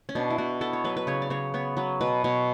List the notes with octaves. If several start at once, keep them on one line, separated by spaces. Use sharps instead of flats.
C#4
B2 D4
E4
B2 F#4
B3 A4
C#5
F#3 B4
B4
C#3 C#5
D5
C#3 C#5
B3 C#5
F#3 B4
B2 B4
B2 C#5